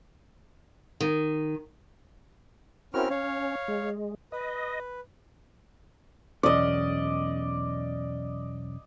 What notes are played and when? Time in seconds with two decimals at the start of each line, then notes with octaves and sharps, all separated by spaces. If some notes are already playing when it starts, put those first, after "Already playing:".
1.00 D#3
2.94 C4 C#4 E4 F#4 A#4 F6
3.10 C#4 C#5 F5
3.68 G#3
4.32 B4 D#5
6.43 B1 E2 C#4 D5 D#5